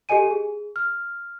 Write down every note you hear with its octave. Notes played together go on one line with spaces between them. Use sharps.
G4 A4 D#5 G#5 D#7
G#4
F6